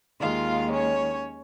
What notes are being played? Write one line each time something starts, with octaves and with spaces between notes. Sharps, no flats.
D#2 D#3 G#3 F4 F5
C#4 C#5